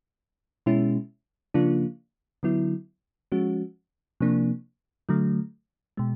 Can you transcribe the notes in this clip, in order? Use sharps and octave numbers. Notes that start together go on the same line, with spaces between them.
B2 G#3 C#4 E4
C#3 F3 A#3 D4 F4
D3 F#3 B3 E4
F3 G#3 C#4 F#4
C3 F3 A#3 D4
D3 F#3 A3
B2 G#3